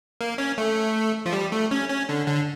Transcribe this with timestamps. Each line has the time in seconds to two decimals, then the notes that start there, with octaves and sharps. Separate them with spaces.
0.21 A#3
0.38 C#4
0.58 A3
1.26 F3
1.33 G3
1.52 A3
1.71 C#4
1.89 C#4
2.09 D3
2.27 D3